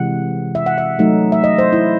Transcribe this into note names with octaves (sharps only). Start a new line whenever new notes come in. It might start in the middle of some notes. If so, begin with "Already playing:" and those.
Already playing: C3 E3 G#3 F#5
E5
F#5
E5
F#3 A3 D#4
E5
D#5
C5
E4